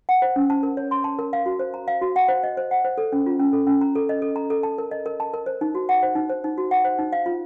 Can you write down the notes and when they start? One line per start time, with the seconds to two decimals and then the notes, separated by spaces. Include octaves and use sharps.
0.09 F#5
0.22 C5
0.36 C#4
0.50 A5
0.63 A#4
0.77 C#5
0.91 C6
1.04 A5
1.19 A#4
1.33 F5
1.46 F#4
1.59 C5
1.74 A#5
1.88 F5
2.01 F#4
2.16 F#5
2.29 C5
2.44 D#5
2.57 C5
2.71 F#5
2.84 C5
2.98 A4
3.12 C#4
3.26 F4
3.40 C#4
3.53 A4
3.67 C#4
3.81 A#5
3.95 A4
4.09 D#5
4.22 A4
4.36 A#5
4.50 A4
4.63 A5
4.78 A#4
4.91 D#5
5.06 A#4
5.20 A5
5.34 A#4
5.46 C5
5.61 D#4
5.75 F#4
5.89 F#5
6.03 C5
6.15 D#4
6.29 C5
6.44 D#4
6.58 F#4
6.71 F#5
6.85 C5
6.98 D#4
7.13 F5
7.26 F4